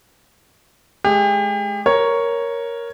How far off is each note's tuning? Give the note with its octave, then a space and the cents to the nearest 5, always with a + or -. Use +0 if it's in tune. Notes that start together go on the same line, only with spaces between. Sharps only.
G#3 +35 G4 +40
A#4 +5 C#5 +0